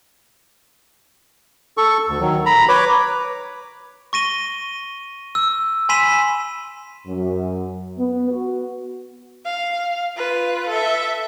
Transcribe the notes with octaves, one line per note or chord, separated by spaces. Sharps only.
A4 C#6
D2
D#3 F#3
A#5 B5
B4 C#5 D6
C#6 A#6 D#7 G7
E6
G#5 B5 C6 B6 D#7 E7
F#2
B3
F#4
F5
F4 B4
A4 E5